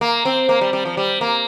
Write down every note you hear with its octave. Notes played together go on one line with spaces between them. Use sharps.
A#3
C4
A#3
G3
G3
F3
G3
A#3